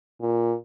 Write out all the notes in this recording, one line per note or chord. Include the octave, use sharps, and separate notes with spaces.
A#2